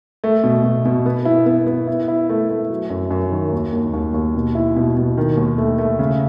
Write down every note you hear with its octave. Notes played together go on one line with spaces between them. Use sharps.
A3
B2
B2
B2
B3
E4
B3
B3
E4
E4
A3
A3
F#3
F#2
F#2
D#3
D#2
D#2
D#2
D#2
B2
E4
B2
B2
D#3
D#2
A3
A3
C#3